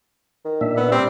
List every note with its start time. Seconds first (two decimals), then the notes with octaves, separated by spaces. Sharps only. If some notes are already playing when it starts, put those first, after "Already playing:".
0.45 D#3
0.61 A#2 D4 E5
0.77 B3
0.92 G3 C4